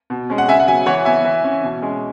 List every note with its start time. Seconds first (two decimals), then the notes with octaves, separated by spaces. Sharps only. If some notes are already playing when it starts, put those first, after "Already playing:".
0.10 B2
0.30 G#3 C#4
0.38 F#5
0.48 C#3 E5 G#5
0.60 F#5
0.67 F#3 B3 E5 G#5
0.86 E3 C#5 F#5
1.05 B3 E5 G#5
1.25 E3
1.44 C#4
1.63 B2
1.82 G#3 C#4